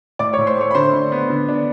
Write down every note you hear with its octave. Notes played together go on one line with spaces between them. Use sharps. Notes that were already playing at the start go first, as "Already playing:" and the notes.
A2 D5 D6
C#5 C#6
A2
C5 C6
A3 C#5 C#6
B5
D3 C5 C6
D4
B3
D3
D4